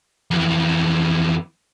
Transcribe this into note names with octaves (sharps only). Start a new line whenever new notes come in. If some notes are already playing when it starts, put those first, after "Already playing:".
F2 E3